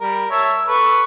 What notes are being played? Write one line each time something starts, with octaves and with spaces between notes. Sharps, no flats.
G3 A#4
C#5 E5 A5
A4 B4 C#6